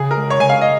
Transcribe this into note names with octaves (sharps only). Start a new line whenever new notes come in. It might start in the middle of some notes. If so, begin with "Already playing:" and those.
Already playing: C#3 G#4
A#4
G#3
C#5
C#3 G#5
F5
D#5